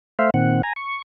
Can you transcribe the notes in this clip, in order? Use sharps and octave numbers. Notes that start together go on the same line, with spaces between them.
A3 C5 E5 F5
A#2 D#3 C4 F#5
G#5 A#5
C#6